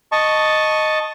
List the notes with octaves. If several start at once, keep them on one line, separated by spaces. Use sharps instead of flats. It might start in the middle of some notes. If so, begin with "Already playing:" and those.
D#5 A5 C#6